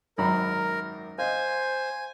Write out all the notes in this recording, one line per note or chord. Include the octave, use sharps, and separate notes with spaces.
G#1 F#2 A#4 B5
C5 D#5 F5 G#5